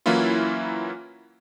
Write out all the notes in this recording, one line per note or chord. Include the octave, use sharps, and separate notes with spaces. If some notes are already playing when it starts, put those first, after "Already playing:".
E3 F#3 A#3 C#4 E4 F4